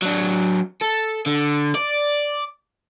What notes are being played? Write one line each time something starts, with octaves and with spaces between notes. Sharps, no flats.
F#3 D4
A4
D3
D5